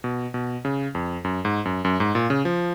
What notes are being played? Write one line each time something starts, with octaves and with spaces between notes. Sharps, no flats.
B2
B2
C#3
F2
F#2
G#2
F#2
F#2
G#2
A#2
C#3
F3